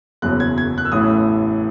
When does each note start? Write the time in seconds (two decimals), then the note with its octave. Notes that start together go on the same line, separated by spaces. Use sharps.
0.22 F#1 E2 B2 F#3 F#6
0.40 G#6
0.58 G#6
0.78 F#6
0.85 E6
0.92 A1 A2 E3 D#6